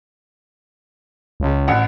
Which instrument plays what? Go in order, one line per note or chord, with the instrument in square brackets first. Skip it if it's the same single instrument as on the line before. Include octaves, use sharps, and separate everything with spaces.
[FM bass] C#2
[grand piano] A1 F#5